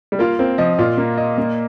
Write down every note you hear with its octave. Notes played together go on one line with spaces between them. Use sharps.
G3
A#3 F4
A#3 C4
F3 D#5
A#2 F4
A#3
D#5
A#3